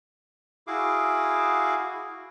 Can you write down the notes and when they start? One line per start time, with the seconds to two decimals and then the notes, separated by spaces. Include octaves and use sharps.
0.67 E4 F#4 G#4 F5 D6